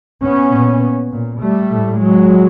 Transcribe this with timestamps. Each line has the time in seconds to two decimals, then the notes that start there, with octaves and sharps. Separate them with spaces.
0.21 B3 C#4
0.52 A#2
1.12 A#2
1.42 G3 A3
1.72 A2
2.01 F#3 G#3